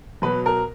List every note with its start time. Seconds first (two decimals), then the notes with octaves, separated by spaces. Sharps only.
0.22 B2 F#3 B4
0.46 A#4